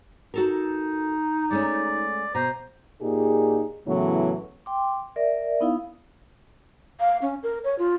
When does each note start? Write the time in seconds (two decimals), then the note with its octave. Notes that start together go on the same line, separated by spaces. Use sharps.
0.34 D#4 F#4 A4 A#4
1.51 G#3 A3 C#4 D5
2.35 B2 C5 A#5
3.01 A#2 D#4 G4 G#4
3.87 A2 C#3 E3 F#3 B3 C#4
4.66 G5 C6 D6
5.16 A#4 D5 E5
5.60 B3 D#4 E4 F5
7.00 F5
7.22 C#4
7.43 A#4
7.64 C#5
7.79 F4